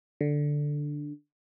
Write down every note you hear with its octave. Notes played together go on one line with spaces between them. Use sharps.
D3